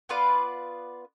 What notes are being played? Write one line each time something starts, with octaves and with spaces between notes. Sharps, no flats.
B3 F4 B4 D5